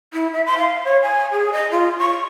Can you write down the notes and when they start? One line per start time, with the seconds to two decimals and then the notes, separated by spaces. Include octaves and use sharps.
0.13 E4
0.33 E5
0.46 C6
0.58 F5
0.85 C#5
1.03 G#5
1.32 G#4
1.53 D#5
1.71 F4
1.99 C#6